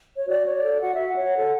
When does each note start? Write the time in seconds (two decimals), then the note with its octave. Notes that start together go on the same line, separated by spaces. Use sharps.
0.16 C#5
0.27 F#4 D5
0.45 C#5
0.54 D5
0.63 A4
0.80 F#4 F#5
0.93 F#4 E5
1.07 F#5
1.15 C#5
1.34 A4